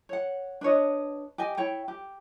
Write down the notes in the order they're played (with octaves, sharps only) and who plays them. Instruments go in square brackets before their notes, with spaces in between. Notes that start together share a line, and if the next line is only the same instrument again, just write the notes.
[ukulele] C#5 F#5
D4 B4 C#5 D#5
G4 D#5 G#5
E4 C#5 G5
G4